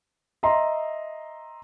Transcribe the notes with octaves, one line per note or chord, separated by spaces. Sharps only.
D#5 E5 A#5 C6